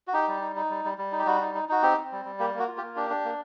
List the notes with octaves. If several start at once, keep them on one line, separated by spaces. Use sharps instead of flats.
F#4
D#4 G4
G3
D#4
D#4
G3
G3
G3
D#4
G4
G3 F#4
D#4
D#4
D#4 F#4
C4 G4
C4
G3
G3
A#3 G4
A#3 F#4
F4
G4
A#3
D4 G4
D4
A#3